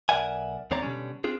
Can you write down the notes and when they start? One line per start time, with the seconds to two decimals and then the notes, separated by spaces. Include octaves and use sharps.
0.09 B1 A#4 D5 E5 F#5 G#5
0.71 D#2 D3 C4 C#5 D5 A#5
0.82 B2 D3 F3 G3 C#4
1.24 C4 D4 F4 G#4